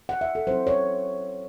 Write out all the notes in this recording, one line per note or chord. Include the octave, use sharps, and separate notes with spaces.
F#5
E5
A4
F#3 C4 E4 C5
C#5